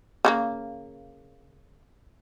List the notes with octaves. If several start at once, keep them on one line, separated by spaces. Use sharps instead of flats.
C#3 G3 A#3